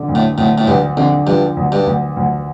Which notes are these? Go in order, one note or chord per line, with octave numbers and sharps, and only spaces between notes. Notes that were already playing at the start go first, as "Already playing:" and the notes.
Already playing: D3
D2
A2
D2 A2
A2
D2 G2
F2 D3
G2 F3
D2
G2
D2
D2